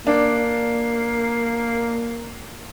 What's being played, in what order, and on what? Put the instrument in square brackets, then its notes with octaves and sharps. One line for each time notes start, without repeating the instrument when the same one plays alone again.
[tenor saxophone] A#3 [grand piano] D4